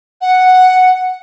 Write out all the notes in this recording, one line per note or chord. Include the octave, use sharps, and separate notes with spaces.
F#5